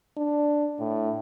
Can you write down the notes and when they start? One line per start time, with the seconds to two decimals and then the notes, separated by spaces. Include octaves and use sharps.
0.17 D4
0.79 A2